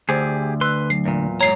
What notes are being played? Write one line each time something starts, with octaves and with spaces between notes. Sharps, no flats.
D2 G4 G#4 C5 D5
B4 C6 E6 F#6
F#3 C7
E2 A#2
G#2 C#5 A#5 C7